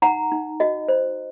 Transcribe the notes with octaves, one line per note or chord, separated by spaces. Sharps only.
D#4 F#5 A#5
D#4
F#4 D#5
C5